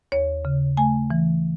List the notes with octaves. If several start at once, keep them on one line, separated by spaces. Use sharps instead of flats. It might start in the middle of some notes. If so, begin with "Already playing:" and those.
D#2 C#5
C#3
A3 G#5
E3